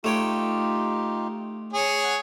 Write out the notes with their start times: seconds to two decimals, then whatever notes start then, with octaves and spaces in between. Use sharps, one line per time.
0.04 A3 D#4 F4 G4 C#5 G5
1.73 G#4 C#5
2.04 F#5